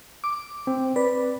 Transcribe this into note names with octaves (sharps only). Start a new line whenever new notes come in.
D6
C4
B4 D5